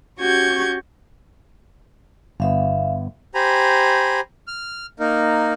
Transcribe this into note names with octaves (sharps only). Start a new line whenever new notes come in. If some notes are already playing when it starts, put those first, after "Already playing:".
C#4 F#4 G4 C#6 G6 G#6
G1 B3 E5 F5
G4 C5 G#5 A#5 B5
F6
A#3 D#4 A#4